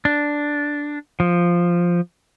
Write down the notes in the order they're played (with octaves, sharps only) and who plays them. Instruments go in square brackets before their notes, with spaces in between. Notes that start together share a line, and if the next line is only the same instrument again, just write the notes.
[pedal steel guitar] D4
F3